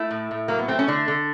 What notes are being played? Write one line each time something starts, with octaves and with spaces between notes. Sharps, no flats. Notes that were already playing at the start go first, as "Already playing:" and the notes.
Already playing: A3 E4
A2
A2
F#3 A#3
B3
A3 C4
C#4
D3 D4
D3